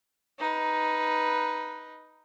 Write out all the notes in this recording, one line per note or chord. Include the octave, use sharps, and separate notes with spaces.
D#4 B4